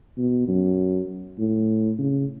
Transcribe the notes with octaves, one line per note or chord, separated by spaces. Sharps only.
B2
F#2
A2
C#3